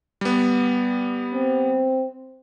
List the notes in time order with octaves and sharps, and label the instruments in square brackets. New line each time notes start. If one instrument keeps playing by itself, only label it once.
[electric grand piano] G3 B3
[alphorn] C4